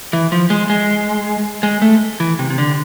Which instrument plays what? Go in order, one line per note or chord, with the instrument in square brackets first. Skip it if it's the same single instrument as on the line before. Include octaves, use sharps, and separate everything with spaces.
[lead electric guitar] E3
F3
G#3
G#3
G#3
A3
E3
C3
C3
D3